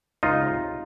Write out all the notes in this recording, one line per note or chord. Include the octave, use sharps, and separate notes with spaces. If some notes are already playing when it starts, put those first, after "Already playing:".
C#2 D#4 F4
C3